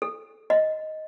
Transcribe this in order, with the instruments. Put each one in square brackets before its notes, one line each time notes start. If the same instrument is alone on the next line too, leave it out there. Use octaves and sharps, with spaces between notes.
[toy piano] A4
D#5